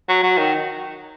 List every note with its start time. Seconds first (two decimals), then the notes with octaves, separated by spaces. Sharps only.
0.09 F#3
0.23 F#3
0.38 D#3